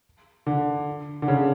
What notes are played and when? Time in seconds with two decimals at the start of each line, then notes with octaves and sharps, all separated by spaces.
0.46 D3
1.22 D3
1.28 C#3